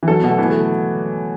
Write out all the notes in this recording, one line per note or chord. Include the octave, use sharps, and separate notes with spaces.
E3
F#3 A4
B3
B2 A3
E3 B3
A3